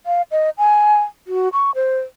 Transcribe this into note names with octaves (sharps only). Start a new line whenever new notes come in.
F5
D#5
G#5
F#4
C#6
C5